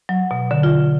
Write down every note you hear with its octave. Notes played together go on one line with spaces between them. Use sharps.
F#3
B2
D3
F4